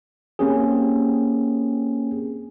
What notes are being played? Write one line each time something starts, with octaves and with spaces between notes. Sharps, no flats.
A#3 C4 C#4 G4 G#4